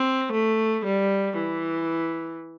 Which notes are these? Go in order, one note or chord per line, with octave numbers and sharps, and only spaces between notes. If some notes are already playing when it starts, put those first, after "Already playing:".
Already playing: C4
A3
G3
E3